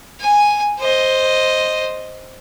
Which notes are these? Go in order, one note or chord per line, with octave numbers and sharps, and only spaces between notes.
G#5
C5 D#5